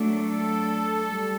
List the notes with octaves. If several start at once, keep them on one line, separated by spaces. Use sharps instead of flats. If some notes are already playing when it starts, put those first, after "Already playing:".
Already playing: F#3 A3 D4
A4
G3